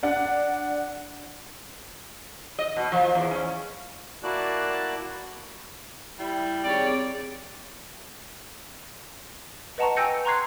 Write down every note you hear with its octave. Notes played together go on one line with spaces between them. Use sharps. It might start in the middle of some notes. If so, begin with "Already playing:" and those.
D4 F#5
D#5
B2
F3
E2
C#4
A#3 E4 F#4 D5 A5 F#6
G3 E4
D#3 C4 G4 G#4 C#5 D5
B4 D#5 F#5 A5 A#5 C#6
G5 G#5 E6 G6 A#6 C#7
A#5 C6 C#6 F#6 G#6 C7